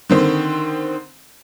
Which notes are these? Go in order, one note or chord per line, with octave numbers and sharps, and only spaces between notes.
D3 D#3 C4